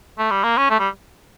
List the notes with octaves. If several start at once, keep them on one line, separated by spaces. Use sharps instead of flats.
A3
G3
A#3
C#4
A3
G3